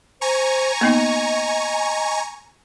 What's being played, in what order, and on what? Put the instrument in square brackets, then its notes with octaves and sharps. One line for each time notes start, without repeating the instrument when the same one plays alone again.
[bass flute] C5 [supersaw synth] G#5 A#5 C#6
[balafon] A#3 B3 D#4 [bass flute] D#5